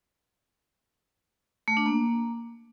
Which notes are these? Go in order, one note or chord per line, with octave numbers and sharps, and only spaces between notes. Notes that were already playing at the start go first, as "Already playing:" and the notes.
A3
D4
A#3